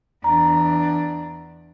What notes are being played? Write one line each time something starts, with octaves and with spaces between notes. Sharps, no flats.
E2 D4 A#5